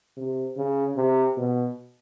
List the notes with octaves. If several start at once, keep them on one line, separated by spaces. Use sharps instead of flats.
C3
C#3
C3
B2